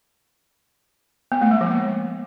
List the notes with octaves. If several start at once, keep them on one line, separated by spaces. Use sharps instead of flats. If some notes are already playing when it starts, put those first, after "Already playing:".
B3
A3
G#3
F3
A#3